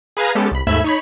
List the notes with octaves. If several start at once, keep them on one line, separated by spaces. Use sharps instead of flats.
G#4 B4 F5 G#5 A#5
G#3 B3 C#4 G4 A4
C2 B5
D#2 G#2 A3 E5 B5 G#6
D#4 C#5 B5